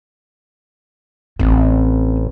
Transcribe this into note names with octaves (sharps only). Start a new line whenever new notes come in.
A1 C4